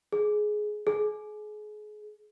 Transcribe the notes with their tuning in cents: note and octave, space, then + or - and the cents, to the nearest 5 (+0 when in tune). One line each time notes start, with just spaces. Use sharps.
G#4 +15
G#4 +30